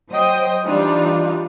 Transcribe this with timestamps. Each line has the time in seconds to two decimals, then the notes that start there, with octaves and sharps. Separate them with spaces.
0.10 F#3 C5 D#5 G5 D#6
0.65 E3 G3 D4 D#4 F4